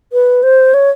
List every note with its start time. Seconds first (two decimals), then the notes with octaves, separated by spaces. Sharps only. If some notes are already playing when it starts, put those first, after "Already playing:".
0.13 B4
0.43 C5
0.74 C#5